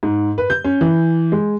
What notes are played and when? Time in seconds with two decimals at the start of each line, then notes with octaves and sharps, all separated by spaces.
0.03 G#2
0.38 B4
0.50 G6
0.64 C#4
0.81 E3
1.32 G#3